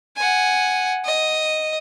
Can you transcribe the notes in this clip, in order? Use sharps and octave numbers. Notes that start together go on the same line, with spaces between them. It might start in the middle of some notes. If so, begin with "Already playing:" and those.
F#5 G#5
D#5